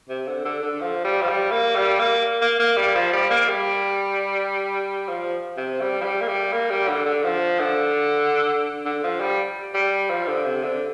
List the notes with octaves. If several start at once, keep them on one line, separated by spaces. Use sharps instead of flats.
C3
D3
D3
D3
F3
G3
F3
G3
A#3
G3
A#3
A#3
A#3
G3
F3
G3
A#3
G3
F3
C3
G3
F3
G3
A#3
G3
A#3
G3
D3
D3
F3
D3
D3
F3
G3
G3
F3
D3
C3
D3